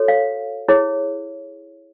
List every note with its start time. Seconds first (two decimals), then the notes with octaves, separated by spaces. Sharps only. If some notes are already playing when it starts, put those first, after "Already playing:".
Already playing: F#4 A4 C#5
0.08 F5
0.68 E4 G#4 C#5